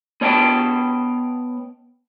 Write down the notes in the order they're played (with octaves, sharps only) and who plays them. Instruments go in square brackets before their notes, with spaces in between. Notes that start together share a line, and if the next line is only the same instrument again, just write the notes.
[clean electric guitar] B3 C#5 D#5 G5 A5